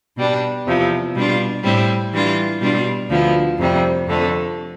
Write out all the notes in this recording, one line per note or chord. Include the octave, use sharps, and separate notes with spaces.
B2 G3 D4
E2 C3 F3
B2 G3 D4 F4
A2 G3 C4 E4
E3 G3 D4 F4
B2 G3 D4 F4
D2 D3 F3 B3 E4
F2 C3 G3
F2 D3 A3